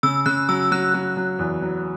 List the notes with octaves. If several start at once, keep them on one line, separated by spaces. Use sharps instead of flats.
C#3 E6
C#3 F#6
F#3 E6
F#3 F#6
F#3
F#3
E2
F#3